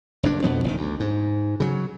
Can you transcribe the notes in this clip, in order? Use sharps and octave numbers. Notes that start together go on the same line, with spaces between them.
F#1 G2 D4
F2 B2 F3 B3
F#1 C3 D#3
D2
G#2
C#3 F#3